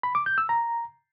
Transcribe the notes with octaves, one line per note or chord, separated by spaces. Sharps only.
B5
D6
G6
E6
A#5